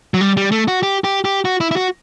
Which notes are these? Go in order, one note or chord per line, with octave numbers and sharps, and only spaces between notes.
F#3
G3
G3
A3
F#4
G4
G4
G4
F#4
E4
E4
F#4